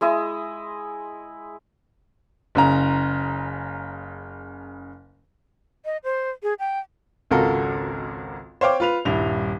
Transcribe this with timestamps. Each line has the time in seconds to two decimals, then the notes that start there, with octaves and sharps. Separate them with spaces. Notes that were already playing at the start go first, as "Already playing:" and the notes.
0.01 G#3 E4 D#5
2.55 F#1 C#3 A#5
5.85 D#5
6.04 C5
6.43 G#4
6.59 G5
7.31 G#1 C#2 F4 F#4 A4 A#4
8.61 C5 C#5 F5 G5 D6
8.80 F4 B4 F7
9.05 D#1 G2 E4 F7